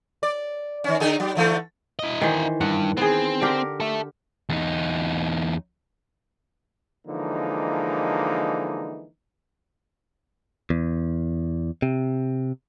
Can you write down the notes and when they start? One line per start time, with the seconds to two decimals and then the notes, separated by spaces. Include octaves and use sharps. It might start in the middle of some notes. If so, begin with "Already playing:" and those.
0.23 D5
0.84 D#3 C#4
1.00 D3 D#4 G#4
1.20 F#3
1.35 D3 E3 A3
1.99 E4 D#5
2.21 D#3 E3 C5
2.61 G2 F#5
2.97 B3 C4 G#4
3.41 D3 G4 A#4
3.80 A4 E5
4.50 E2 D#4
7.07 D3 E3 F3 G#3 A#3 D#4
10.70 E2
11.82 C3